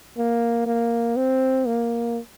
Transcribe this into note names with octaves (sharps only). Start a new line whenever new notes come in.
A#3
A#3
C4
A#3